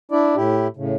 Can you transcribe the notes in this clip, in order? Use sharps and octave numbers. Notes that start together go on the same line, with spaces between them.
D4 E4 D5
A2 E4 G4
A2 C#3